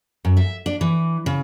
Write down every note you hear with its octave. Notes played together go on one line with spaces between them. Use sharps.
F#2
E5
D4
E3
C#3